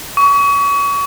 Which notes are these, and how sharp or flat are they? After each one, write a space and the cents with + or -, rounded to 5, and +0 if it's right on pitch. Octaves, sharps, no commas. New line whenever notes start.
C#6 +35